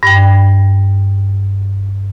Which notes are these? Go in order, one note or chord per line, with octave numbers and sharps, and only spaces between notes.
G2 G5